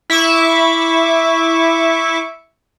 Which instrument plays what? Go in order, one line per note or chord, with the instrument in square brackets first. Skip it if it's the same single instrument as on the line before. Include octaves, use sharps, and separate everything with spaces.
[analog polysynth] E4 E5 C#6 D6